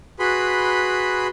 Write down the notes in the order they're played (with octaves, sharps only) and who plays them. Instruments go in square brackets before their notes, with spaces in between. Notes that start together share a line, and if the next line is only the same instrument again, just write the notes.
[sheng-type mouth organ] F#4 G#4 B4 B5 C6